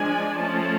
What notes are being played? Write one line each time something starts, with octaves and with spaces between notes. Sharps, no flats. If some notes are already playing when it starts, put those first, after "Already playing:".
Already playing: F3 G#3 D4 G#5
F3 A3 C#4 A5